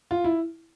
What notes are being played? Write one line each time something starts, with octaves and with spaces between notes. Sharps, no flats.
F4
E4